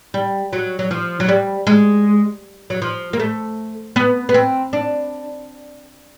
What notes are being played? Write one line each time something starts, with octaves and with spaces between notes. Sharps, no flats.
G3
F#3
F#3
F3
F#3
G3
G#3
F#3
F3
A#3
A3
B3
B3
C4
D4